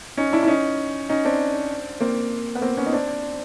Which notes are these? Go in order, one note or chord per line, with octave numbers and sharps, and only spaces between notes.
C#4 D#4
D4 E4
E4
C#4 D#4
C#4 D#4
C4 D4
A#3 C4
B3
A#3 C4
B3 C#4
D#4
C4 D4